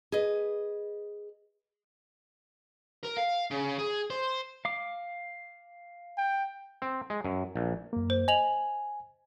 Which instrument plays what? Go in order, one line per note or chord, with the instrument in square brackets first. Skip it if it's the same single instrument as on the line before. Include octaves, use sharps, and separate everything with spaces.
[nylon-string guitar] G#4 B4 D#5
[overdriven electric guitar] A#4
F5
C#3
G#4
C5
[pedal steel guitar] F5 D6
[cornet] G5
[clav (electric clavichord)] C4
G#3
F#2
A#1
[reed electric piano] F#2 A#3
[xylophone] C5
[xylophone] D#5 F7 F#7 [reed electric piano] G#5